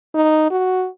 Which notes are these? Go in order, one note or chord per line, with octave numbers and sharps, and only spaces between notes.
D#4
F#4